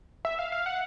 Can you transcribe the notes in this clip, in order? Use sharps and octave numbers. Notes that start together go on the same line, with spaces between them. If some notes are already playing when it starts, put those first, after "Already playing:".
E5
F5
F5
F#5